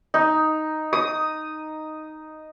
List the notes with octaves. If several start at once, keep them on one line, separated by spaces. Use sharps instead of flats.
D#4
D#6